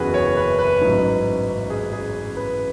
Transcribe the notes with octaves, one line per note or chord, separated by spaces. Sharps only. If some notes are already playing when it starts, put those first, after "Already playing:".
Already playing: F#1 E2 C#3 E3 F#4 G#4 B4
C#5
B4
B4
A1 G#2 F#3
G#4
G#4
B4